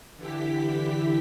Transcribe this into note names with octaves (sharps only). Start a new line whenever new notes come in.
D3 E3 E4 G4 B6